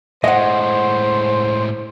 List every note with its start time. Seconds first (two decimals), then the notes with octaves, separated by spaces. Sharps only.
0.24 A2 G#3 C5 D#5 F#5